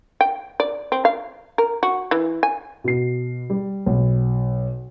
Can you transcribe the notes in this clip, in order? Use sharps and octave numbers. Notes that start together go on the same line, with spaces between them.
G5
D5
C4
F5
A#4
F#4
E3
G#5
B2 C7
G3
B1